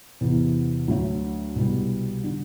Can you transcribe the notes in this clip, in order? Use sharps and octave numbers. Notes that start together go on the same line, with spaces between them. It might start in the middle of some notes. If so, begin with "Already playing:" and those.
E2 C3 E3 B3
D2 D3 F#3 A3
C2 B2 G3
D3